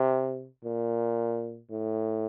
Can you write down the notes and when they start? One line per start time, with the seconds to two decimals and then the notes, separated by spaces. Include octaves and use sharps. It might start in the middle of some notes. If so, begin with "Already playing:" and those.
Already playing: C3
0.64 A#2
1.71 A2